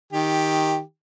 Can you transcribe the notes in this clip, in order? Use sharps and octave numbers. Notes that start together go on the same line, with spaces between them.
D#3 G4